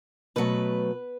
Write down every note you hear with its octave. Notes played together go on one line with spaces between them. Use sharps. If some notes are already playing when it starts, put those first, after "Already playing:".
B2 F#3 A3 B4